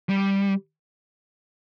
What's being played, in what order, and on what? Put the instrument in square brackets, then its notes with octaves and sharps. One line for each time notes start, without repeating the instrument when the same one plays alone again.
[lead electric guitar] G3